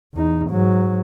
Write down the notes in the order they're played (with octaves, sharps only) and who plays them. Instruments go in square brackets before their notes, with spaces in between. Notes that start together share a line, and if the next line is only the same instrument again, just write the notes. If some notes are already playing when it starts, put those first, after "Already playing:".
[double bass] E2 D#4
G#2 F#3